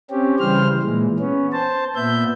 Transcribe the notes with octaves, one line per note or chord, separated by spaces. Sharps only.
C4 C#4 G4
C#3 E3 G3 C5 F6
A#2 E3 G#3
B3 C#4
C5 A5
A#2 B3 E5 G6